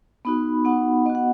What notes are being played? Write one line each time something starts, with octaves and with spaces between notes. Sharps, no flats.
B3 D#4 F#4 B5
B3 D#4 F#4 F#5
B3 F#4 D#5
F#5